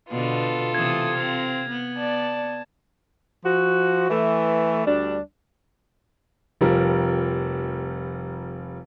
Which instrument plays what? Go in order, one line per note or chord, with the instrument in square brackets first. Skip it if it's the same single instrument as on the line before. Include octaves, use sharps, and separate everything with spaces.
[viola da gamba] B2 D3 [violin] B3 [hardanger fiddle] F4 A4
[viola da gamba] C3 E3 [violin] A3 D#6 [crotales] G#6
[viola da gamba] C4 [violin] F5 A#6
[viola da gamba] B3
[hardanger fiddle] D5 [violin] A5
[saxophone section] F3 F#4
E3 A3
D2 G3 D4
[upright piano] F1 F3 G3 A#4